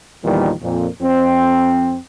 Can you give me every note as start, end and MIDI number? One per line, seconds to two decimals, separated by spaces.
0.25 0.52 40
0.25 0.52 46
0.25 0.52 51
0.25 0.52 53
0.25 0.52 55
0.63 0.87 41
0.63 0.87 46
1.01 1.98 41
1.01 1.98 60